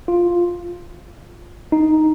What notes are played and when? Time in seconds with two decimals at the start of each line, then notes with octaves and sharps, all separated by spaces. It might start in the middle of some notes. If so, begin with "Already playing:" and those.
0.08 F4
1.72 D#4